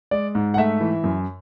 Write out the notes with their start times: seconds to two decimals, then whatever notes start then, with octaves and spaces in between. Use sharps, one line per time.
0.11 G#3 D5
0.35 G#2
0.54 F#5
0.57 A3 E5
0.81 E3
1.04 F#2